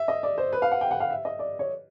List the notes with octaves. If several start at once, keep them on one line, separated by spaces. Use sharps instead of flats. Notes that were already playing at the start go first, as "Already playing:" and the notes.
Already playing: E5
D#5
D5
C5
B4
F5
F#5
G5
F#5
F5
E5
D#5
D5
C#5